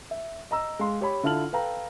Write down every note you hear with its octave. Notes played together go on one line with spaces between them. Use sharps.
E5
D#5 A#5 E6
G#3 F5 C6
G4 C#5 B5
D3 E4 F4 A5 F6 F#7
A4 B4 F5 G5 A#5